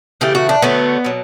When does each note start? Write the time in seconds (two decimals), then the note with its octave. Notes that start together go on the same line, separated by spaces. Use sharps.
0.21 C#3 E3 A3 G4
0.35 F#4
0.49 D4
0.62 D3 F#3 A3 B3
1.04 B2 F#3